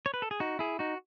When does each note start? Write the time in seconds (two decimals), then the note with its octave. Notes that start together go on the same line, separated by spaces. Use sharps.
0.06 C#5
0.14 B4
0.22 A4
0.31 G#4
0.40 D#4 F#4
0.59 E4 G#4
0.79 D#4 F#4